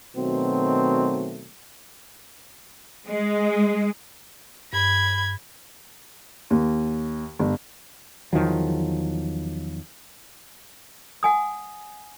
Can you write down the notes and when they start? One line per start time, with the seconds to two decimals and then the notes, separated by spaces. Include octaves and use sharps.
0.16 B2 D#3 F#3 A3 C4
3.07 G#3
4.73 G2 B5 G#6
6.50 D#2
7.39 G1
8.33 E2 D#3 F3 F#3
11.23 F#5 G#5 D#6